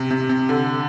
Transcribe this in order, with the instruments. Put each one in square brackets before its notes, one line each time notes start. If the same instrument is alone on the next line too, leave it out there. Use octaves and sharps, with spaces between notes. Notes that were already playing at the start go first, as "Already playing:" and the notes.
Already playing: [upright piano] C3
C3
C3
D3